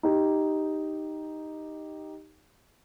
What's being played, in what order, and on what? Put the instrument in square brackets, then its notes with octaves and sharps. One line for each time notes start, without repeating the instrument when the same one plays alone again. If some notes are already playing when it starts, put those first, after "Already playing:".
[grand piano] D#4 G4